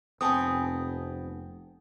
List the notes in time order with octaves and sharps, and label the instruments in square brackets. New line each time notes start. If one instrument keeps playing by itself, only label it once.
[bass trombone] F1 [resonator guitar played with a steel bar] B3 C4 [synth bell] G#5 A5 D#6